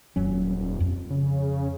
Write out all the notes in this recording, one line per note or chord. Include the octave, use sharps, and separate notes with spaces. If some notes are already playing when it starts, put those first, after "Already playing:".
D#1 F2 F#3 C#4
F2
C#3